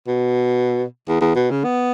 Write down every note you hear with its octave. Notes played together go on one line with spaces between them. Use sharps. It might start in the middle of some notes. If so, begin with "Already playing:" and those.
B2
E2
E2
B2
C#3
B3